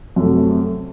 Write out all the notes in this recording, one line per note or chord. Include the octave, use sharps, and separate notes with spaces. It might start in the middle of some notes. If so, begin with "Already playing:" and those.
F#2 C3 A3